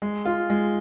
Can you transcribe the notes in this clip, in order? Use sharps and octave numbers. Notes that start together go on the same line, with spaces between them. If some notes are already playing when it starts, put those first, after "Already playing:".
G#3
F4
G#3